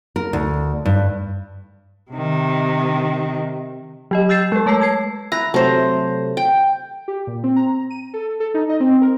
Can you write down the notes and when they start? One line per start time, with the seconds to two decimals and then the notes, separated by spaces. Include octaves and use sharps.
0.16 A#4
0.33 D2
0.85 G2
2.11 C3 D#3
4.11 F#3 G4 D#5
4.29 E6 G6 A6 C7 E7
4.52 G#3 B4
4.66 A3 C#5 A5 E6 C7
4.81 G#6 C7
5.32 E4 B4 A#5
5.54 C3 F#3 A3 C5 A#5
6.37 G5
7.08 G4
7.27 A#2
7.44 C4
7.56 A#5
7.90 D#7
8.14 A4
8.40 A4
8.54 D#4
8.69 D#5
8.80 C4
9.02 A#4